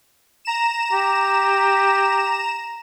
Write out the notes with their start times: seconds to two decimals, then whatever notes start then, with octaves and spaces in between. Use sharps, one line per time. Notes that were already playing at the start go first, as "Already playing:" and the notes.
0.45 A#5 E7
0.93 G4